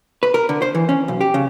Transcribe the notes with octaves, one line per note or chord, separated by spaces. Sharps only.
B4
A#4
D3
C5
E3
C#4
B1
G4
C#3